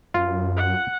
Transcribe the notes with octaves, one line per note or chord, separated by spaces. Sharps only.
F#2 F4
F#5